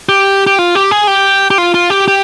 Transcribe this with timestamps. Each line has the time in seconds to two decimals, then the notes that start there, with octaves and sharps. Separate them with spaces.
0.09 G4
0.47 G4
0.59 F4
0.75 G4
0.91 G#4
1.07 G4
1.50 G4
1.58 F4
1.74 F4
1.90 G4
2.08 G4